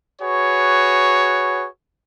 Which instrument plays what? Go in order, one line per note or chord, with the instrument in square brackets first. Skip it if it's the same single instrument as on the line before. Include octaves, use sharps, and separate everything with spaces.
[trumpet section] F#4 G#4 B4 C#5